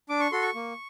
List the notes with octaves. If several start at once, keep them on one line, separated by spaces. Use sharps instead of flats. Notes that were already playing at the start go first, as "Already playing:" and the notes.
D4 D6
C#6
F#4 A4 C6
C#6
A#3